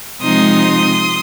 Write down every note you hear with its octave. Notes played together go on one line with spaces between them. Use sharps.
C3 F3 G#3 D#4 C6 D#6